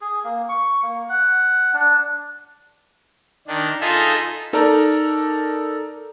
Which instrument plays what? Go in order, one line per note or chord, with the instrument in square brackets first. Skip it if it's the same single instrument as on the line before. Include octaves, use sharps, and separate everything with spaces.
[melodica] G#4
A#3
C#6
A#3
F#5
D4
[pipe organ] D#3 D4
D#4 F4 G#4 A4 E5
[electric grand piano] D#4 A4 A#4 D5 A#5